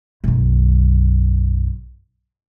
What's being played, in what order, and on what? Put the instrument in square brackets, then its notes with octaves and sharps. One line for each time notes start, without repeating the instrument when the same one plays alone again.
[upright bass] B1 F#2